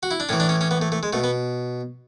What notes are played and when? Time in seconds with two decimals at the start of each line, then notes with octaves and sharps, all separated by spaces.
0.03 F#4
0.11 E4
0.20 D4
0.29 A2 E3 C#4
0.40 D4
0.49 C#4
0.61 C#4
0.71 B3
0.82 A3
0.92 A3
1.03 G#3
1.13 B2 A3
1.24 B3